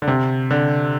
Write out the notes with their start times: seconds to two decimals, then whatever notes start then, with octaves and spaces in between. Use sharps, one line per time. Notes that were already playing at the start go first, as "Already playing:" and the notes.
0.02 D3
0.07 C3
0.51 D3